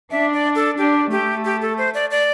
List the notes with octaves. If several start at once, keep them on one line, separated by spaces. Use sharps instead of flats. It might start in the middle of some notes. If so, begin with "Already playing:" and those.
D4 E5
D5
A4
D4 G4
A3 G4
G4
A4
C5
D5
D5